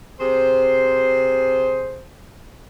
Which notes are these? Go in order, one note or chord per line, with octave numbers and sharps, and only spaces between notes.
C3 G#4 C5